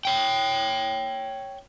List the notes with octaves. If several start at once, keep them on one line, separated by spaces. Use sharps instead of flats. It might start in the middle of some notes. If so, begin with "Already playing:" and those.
C#5 G5